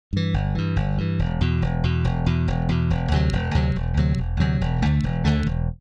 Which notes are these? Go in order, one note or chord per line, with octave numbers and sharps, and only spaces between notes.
G2 E3
G1
G2 E3
G1
G2 E3
E1
E2 B2
E1
E2 B2
E1
E2 B2
E1
E2 B2
E1
D2 C3 F#3
E1
D2 C3 F#3
E1
D2 C3 F#3
E1
D2 C3 F#3
E1
D2 D3 A3
E1
D2 D3 A3
E1